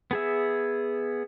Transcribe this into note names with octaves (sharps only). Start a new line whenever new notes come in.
B3 G#4 E5